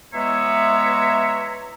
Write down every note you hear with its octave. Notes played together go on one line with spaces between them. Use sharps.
E3 G#3 B3 C#5 E5 A#5